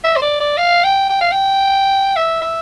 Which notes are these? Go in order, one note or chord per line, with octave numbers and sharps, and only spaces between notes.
E5
C5
D5
D5
F5
G5
G5
F5
G5
E5
E5